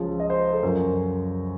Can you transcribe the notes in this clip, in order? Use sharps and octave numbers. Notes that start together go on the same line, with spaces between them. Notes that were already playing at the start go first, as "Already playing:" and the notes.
Already playing: C#2 C#3 F3
D#5
C5
A4
F#2 F3 A#4